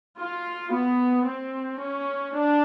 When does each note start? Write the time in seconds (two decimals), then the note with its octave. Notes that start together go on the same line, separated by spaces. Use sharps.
0.17 F4
0.71 B3
1.25 C4
1.80 C#4
2.34 D4